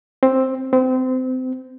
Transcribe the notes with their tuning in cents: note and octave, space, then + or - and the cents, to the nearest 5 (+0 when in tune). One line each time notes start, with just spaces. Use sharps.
C4 +5
C4 -30